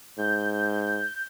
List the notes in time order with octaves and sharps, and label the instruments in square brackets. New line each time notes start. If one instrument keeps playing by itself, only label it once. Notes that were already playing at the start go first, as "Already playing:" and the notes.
[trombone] G#2 [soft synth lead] G6